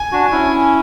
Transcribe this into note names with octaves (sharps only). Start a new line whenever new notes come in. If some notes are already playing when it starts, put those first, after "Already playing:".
Already playing: G#5
D4 F#4
C#4 E4